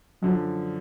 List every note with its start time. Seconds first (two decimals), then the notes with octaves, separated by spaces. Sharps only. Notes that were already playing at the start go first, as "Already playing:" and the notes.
0.23 F#2 D3 F3 F#3